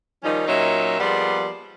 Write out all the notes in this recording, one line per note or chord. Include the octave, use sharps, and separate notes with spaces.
D#3 F3 G3 C#4 D#4
A#2 F#3 C#4 D#4 C#5 E5
F3 G3 A#3 B3 G#4 D5